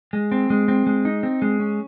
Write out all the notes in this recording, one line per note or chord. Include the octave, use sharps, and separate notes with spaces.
G#3
C4
G#3
C4
G#3
D#4
C4
G#3
C#4